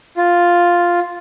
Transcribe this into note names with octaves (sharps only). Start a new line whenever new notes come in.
F4